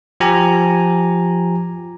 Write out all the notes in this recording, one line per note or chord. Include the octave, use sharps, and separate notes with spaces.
F3 G4 G#5 A#5